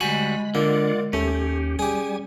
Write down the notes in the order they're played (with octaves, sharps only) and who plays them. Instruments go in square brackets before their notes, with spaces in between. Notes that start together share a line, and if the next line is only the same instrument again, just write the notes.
[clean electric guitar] D2 G3 F#4 [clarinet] G#3 [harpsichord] G#5 [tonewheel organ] B5
[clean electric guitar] D3 [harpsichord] A#3 [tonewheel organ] F4 D5 F#5
[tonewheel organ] D#2 G4 [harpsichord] A3 [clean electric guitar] C#4
[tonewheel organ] G3 G#5 [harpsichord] G4 G#4